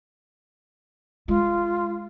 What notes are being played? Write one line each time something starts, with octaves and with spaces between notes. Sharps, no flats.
G#3 F4